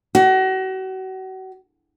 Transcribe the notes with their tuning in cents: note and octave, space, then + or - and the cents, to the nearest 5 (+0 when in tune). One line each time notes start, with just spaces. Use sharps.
F#4 +35